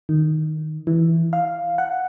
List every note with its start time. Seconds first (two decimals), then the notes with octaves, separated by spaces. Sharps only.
0.09 D#3
0.87 E3
1.33 F5
1.78 F#5